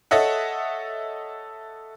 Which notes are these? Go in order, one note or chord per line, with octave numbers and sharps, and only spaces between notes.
A4 C#5 D#5 E5 F#5